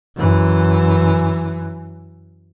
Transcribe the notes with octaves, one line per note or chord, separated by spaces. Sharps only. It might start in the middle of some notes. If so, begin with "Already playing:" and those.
F#2 E3